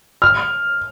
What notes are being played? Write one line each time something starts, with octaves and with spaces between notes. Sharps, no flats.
F6